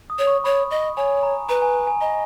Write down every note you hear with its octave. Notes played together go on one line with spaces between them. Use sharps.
D#6
C#5
C#6
C#5 B5
D#5
C#5 G#5
A#5
B4 A#5
G#5
G#5
D#5 A#5